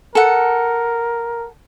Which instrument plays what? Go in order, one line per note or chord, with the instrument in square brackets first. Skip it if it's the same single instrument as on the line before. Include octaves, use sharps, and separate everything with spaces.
[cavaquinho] A4 F#5 [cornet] A#4